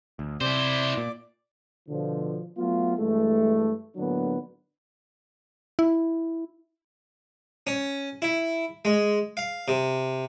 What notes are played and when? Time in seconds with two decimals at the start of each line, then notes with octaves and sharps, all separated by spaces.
0.19 D2
0.41 C3 E4 C5 D5
0.97 A#2
1.89 B2 D3 F3
2.57 F#3 A3 B3 F4
2.98 G2 E3 G#3 A3
3.96 A2 D3 F#3 A#3 B3 D4
5.79 E4
7.67 C#4
8.22 E4
8.85 G#3
9.37 F5
9.68 C3